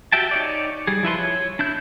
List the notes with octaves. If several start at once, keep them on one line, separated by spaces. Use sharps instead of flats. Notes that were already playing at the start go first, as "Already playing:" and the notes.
F#4 G4 E5 G5 A5
D#4 C#5 D5
G3 G#4
F3 E4 B4 C6
C#5
D4 E4 G6